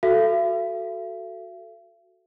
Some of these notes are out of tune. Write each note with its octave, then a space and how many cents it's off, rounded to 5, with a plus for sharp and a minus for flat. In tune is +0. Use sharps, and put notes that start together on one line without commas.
F#4 +0 A4 +0 E5 +45